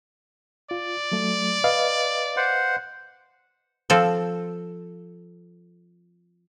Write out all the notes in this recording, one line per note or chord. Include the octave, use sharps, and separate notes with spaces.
F4 D5
F#3 A3
B4 D#5 F5
C5 F#5
F3 C4 A4